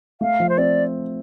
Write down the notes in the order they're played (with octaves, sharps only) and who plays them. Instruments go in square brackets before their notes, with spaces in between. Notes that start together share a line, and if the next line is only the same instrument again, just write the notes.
[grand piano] A3 [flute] F5
[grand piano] F3
[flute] C5
[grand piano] C4 [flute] D5